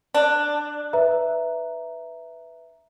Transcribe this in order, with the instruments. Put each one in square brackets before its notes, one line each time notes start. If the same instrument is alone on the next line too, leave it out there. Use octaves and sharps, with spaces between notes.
[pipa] D4
[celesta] B4 E5 A#5